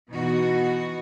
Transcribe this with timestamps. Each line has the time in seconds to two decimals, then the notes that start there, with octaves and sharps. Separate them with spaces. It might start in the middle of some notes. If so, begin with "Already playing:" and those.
0.10 B2 E3 B3 D#4 F#4